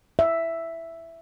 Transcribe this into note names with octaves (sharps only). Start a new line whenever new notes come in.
E5